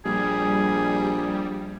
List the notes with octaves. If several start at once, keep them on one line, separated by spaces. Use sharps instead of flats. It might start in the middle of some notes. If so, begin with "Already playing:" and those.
A#1 G3 G#4